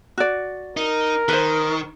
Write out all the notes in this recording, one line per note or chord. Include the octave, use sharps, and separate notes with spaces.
F#4 D5
D#4 A#4
D#3 B4 C5